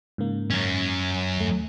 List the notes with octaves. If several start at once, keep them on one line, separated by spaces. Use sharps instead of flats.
G#2 C#3 A#3
F#2 C#4
D#2 A3